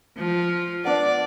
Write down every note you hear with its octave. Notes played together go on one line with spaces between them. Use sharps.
F3
B3 D4 D5